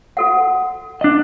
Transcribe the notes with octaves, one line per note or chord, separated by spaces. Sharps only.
F#4 A4 F#5
D4 D#5